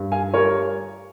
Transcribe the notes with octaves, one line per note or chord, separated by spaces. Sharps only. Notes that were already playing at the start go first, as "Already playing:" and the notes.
Already playing: G2
F5 G#5
G3 A#4 C#5